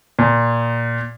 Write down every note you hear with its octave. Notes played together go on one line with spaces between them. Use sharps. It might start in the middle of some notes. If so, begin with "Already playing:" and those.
A#2